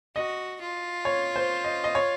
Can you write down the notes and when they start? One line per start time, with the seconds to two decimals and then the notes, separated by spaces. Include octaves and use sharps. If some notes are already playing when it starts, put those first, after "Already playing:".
0.16 F#4 D#5
0.61 F4
1.05 C#5
1.36 C5
1.64 D#5
1.84 D#5
1.95 C#5